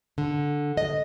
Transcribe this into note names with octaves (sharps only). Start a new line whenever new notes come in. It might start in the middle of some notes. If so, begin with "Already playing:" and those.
D3
D#5